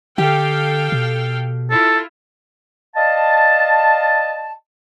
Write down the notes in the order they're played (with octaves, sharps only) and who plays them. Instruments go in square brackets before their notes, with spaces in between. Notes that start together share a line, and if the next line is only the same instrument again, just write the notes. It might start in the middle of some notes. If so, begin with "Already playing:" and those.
[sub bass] D3 [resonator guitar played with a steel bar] G4 [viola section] A4 F5 G5
[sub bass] B2
[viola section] E4 F4 [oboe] A4
[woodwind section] D5 D#5 F5 A5